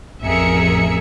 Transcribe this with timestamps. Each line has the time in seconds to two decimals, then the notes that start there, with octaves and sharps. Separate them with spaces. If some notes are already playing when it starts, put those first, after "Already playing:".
0.22 A1 F2 G#4 A#4 E5 C#7